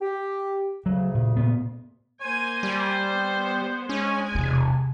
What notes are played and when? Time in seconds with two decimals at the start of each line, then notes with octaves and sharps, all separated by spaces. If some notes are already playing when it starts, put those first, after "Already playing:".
0.01 G4
0.86 D2 C#3 F#3
1.14 A#2
1.37 A#2 B3
2.21 A#3 C5 G#5
2.63 G3
3.14 B3
3.89 G#3 C#4 G#5
4.35 E1 C3